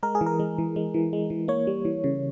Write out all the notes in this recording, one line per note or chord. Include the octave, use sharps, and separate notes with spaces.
G#3 A#4
G#4
E3
A#4
G#3
E3
G#3
E3
G#3
E3
A#3 C#5
G3
E3
C#3